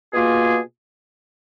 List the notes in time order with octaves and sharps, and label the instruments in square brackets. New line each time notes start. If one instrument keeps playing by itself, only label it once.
[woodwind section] B2 A#3 F4 G#4